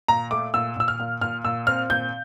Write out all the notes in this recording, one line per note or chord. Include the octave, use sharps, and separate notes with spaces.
A#2 A#5
A3 D6
A#2 E6
A#2 E6
F6
A#2
A#2 F6
A#2 E6
C4 F6
A#2 G6